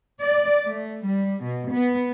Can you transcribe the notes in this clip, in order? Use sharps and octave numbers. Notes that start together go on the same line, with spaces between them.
D5
A3
G3
B2
B3